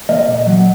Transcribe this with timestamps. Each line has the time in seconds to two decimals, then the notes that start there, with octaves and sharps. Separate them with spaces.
0.09 A#3 D#5
0.28 A#2
0.47 F#3